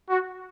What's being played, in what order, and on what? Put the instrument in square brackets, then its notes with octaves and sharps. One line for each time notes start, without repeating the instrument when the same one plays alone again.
[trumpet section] F#4